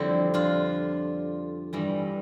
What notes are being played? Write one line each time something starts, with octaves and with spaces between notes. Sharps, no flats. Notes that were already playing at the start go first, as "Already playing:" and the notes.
Already playing: F2 D3 G3 C4 E4
D4 F4
G2 E3 G3